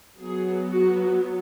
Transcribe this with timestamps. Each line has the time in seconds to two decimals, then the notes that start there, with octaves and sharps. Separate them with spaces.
0.20 F#3 B3 G#4
0.69 F#4